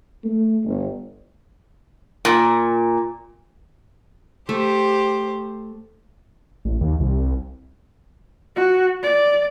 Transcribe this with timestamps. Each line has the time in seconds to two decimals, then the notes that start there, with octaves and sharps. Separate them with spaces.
0.25 A3
0.65 G1
2.25 A#2
4.49 A3 G4 C5
6.65 A1
6.81 D#2
7.00 C2
8.56 F#4
9.03 D5